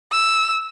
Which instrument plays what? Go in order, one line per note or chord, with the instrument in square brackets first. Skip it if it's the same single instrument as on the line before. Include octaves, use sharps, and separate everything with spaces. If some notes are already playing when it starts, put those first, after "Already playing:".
[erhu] E6